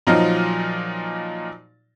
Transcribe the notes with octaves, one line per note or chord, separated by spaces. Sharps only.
A#2 F3 F#3 D#4 F4